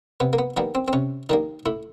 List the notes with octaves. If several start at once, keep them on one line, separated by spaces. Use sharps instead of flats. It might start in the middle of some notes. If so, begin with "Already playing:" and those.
C3 B3
A#3
B3
D#3 G3 A#3 B3
C4
C4
C3 C#4
D#3 G3 A#3 D#4
A2 E4